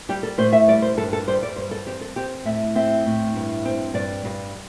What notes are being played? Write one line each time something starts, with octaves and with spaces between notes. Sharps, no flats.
G3 G4
A4
A2 C5
E5
G3 D5
C5
G2 A4
A4
G3 C5
D5
G2 C5
A4
C4 G4
A4
C4 G4
A2 E5
C4 E5
A2
G2
C4
G2 D5
G2